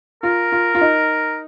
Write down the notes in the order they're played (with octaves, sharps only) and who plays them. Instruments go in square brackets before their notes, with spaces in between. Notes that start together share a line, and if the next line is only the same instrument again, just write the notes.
[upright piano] F4 [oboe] A#4
[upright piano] F4
F4
D#4